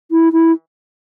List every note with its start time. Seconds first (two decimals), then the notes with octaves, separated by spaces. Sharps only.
0.11 E4
0.33 E4